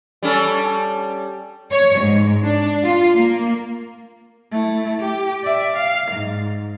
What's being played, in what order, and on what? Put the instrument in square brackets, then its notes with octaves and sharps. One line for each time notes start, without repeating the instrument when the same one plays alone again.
[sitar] G3 C#4 A4
[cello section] C#5
G#2
D4
F4
A#3
[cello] A3 E4
G4
D5 E5
F5
G#2